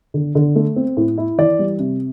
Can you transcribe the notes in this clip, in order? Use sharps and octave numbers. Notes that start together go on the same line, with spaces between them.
D3
D3
A3
C4
A2
E4
E3 D5
G3
C3